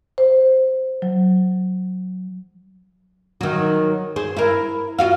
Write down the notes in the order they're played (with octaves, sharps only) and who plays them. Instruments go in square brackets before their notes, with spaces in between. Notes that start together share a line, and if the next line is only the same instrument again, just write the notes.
[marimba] C5
F#3
[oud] D#3 F#3
G#4 C5
E4 A#4
F4 F#4 F5